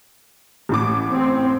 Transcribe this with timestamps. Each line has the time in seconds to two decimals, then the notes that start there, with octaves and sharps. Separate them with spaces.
0.69 A1 A2 D6
1.12 C4